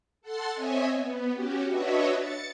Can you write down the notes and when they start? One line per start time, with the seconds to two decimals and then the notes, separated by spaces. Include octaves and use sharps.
0.22 A4 F#5 C6 A6 C7
0.53 C4 C#5 D#5 E5 G#5
0.94 B3
1.32 C#4 F#4 G4
1.68 D4 F#4 B4 C#5 D#5 E5
2.18 A6 C#7